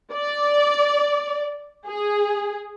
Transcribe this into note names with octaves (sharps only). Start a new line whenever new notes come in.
D5
G#4